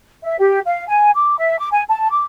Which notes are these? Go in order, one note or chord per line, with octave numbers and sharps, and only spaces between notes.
E5
G4
F5
G#5
D6
E5
D6
G#5
A5
D6